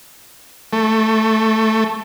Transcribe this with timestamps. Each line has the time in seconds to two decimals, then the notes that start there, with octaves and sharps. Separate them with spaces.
0.73 A3